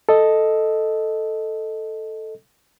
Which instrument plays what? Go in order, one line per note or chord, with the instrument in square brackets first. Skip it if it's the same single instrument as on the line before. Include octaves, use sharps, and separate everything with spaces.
[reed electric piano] A4 D#5